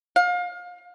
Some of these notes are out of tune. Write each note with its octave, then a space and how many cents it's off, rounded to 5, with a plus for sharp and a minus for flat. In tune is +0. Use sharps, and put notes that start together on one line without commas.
F5 +30